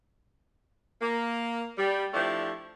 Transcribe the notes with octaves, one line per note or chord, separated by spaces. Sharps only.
A#3
G3
F3 A3 D4 E4 G4